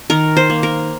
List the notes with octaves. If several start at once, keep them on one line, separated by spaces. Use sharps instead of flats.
D#3 A#4
C5
A#3
A#4